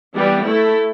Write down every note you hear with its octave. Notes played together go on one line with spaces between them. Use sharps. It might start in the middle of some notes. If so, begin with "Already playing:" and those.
E3 G3 B3
A3 E4 A4